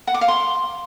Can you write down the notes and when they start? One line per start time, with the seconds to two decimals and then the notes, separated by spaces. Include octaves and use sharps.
0.07 F#5
0.14 D6
0.21 F5
0.28 C6